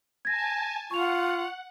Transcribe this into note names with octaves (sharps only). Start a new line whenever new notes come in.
G#5 A5 G#6 A#6
F4 F#5 C#6 F7